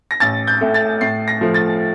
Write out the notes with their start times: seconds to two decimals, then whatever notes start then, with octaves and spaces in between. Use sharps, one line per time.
0.11 A#6
0.20 A1 A6
0.47 G6
0.61 A2 A3
0.74 A6
1.01 A2 C7
1.28 A#6
1.41 F3 A3
1.54 A6